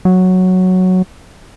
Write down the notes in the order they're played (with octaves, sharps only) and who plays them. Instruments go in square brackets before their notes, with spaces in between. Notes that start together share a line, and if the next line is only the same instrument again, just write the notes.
[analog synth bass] F#3